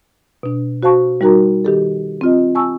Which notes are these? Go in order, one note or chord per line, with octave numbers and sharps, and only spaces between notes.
B2 D4
F#4 C5 F5 A5 C#6
G3 D#4 F#4 A#4 A#5
D#3 G4 A4
C4 F4 D#5
G#5 A5 C#6 E6